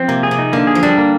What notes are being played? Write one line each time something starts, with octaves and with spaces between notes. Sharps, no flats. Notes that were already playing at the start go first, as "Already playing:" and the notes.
Already playing: F3 C4
C3 A#3
G#4
C3
D#4
D3 A#3
G#4
F3
G3 D4
A#3